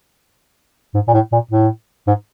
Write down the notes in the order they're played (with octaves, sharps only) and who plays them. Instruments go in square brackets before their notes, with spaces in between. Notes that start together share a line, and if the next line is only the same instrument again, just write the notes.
[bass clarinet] G#2
A#2
A2
A#2
A2
G#2